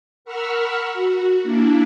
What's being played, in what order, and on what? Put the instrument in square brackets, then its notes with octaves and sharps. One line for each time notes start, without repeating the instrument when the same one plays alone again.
[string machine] A#4 F#5 B5 C#6 E6 F6
F#4
A#3 D4 E4